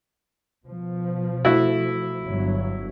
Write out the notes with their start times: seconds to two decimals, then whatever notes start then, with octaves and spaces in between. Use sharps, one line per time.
0.65 B2 F3
1.45 A3 E4 F#4
2.24 G1 F#3